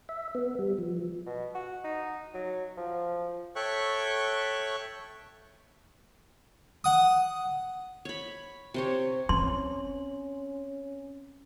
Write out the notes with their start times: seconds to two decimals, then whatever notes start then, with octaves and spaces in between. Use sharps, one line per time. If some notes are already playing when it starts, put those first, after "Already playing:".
0.09 E5
0.35 B3
0.59 G3
0.78 F3
1.26 B2
1.55 F#4
1.84 D#4
2.34 F#3
2.77 F3
3.56 A4 C#5 E5 G5 C#6 F#6
6.84 F#5 D#6
8.05 C#5 B5
8.74 C3 C5 C#5
9.29 C4 C#4 C6